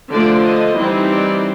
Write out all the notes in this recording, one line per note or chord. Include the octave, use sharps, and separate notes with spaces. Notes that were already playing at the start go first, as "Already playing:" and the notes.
D3 F3 A3 D5
D#5
E3 G3 C4 D#4
D5